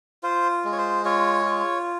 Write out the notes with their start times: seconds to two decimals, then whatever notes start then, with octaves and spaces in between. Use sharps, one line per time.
0.23 F4 C5
0.65 G#3
0.72 C#5
0.78 C5
1.05 F4 C#5
1.45 F4